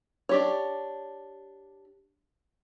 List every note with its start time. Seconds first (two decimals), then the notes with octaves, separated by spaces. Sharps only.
0.29 D4 G4 C#5